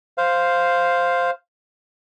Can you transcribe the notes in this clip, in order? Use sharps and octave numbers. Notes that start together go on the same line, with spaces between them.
C5 F5